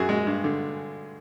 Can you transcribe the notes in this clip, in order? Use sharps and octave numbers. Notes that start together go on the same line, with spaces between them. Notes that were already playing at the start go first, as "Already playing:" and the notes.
Already playing: F#2 F#4 G#4
G#3
G2
D3